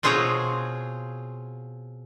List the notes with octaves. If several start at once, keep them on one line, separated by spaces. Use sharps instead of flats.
B2 C4 F4 G#4 C#5 A#5